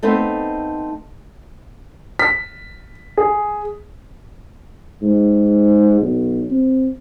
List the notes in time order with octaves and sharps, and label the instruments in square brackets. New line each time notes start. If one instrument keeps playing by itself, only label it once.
[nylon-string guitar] A3 B3 C4 D#4 A4
[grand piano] B6
G#4
[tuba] G#2
B1
C4